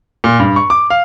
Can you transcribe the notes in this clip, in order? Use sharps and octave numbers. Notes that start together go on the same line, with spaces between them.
A#2
G2
C#6
D6
F5